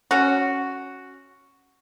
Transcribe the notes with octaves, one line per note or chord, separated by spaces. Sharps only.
C#4 F#4